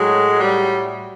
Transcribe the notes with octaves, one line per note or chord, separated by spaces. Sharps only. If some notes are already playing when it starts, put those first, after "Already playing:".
Already playing: A2 F#3 G#3
G3